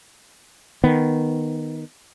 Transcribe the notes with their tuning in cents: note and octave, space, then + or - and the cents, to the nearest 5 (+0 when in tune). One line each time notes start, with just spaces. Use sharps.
D#3 +0 B3 -5